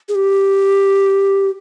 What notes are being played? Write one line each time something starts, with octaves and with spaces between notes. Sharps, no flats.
G#4
G4